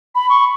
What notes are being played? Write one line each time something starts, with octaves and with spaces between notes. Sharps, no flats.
B5
C#6